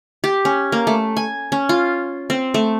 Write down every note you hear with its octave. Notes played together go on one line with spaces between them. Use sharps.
G4
C#4
A#3
A3
G#5
C#4
F4
C4
A3